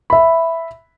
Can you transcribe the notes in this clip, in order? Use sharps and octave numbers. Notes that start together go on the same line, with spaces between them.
E5 B5